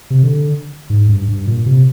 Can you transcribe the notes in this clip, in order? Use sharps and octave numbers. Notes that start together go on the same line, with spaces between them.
C3
D3
G#2
G2
G2
A#2
C3